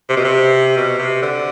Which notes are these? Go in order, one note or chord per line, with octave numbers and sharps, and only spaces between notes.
C3
B2
C3
B2
C3
D3